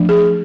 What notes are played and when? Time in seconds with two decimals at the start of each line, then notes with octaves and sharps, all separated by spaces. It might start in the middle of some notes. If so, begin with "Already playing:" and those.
Already playing: F3 A3 D4
0.09 G#4